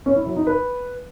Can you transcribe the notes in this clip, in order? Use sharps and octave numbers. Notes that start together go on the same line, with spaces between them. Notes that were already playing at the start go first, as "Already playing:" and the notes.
C#4
E4
F#3
D#4
B4